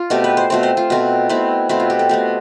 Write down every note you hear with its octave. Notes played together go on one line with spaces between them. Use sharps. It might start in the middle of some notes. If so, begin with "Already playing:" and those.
Already playing: F4
B2 A3 C4 G4
B4
C5
B2 A3 C4 C5
C5
F4
B2 A3 C4
B2 A3 C4 E4
B2 A3 C4 E4
F4
G4
A4
B2 A3 C4 G4